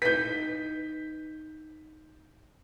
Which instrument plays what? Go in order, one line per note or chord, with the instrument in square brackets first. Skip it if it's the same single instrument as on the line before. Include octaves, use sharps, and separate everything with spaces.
[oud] D#4 B4 [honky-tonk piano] G6 B6